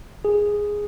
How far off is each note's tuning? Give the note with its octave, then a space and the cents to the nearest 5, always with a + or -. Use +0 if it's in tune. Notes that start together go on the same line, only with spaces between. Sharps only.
G#4 -5